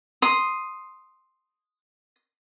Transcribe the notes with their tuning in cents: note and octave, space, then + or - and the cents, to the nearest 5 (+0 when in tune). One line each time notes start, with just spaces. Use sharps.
C6 +0 D#6 +0